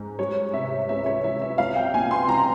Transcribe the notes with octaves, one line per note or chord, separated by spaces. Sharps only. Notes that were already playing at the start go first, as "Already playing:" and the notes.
Already playing: G#2
G3 C#5
C3 E5
C#2 E5
C#5
E3 E5
E5
C2 F5
G5
A#2 G#5
C6
C2 A#5